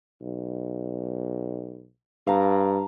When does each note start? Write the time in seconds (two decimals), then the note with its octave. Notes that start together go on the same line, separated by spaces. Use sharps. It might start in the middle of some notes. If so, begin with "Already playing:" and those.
0.22 B1
2.27 G2 F5 A5 A#5